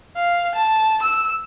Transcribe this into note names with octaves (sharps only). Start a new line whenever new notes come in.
F5
A5
E6